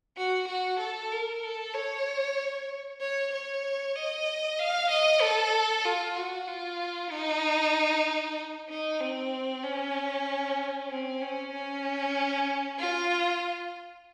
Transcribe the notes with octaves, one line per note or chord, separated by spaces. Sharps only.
F#4
F#4
A4
A#4
A4
C#5
C#5
C#5
D#5
F5
D#5
A4
F4
F#4
F4
D#4
D#4
C4
C#4
C4
C#4
C#4
F4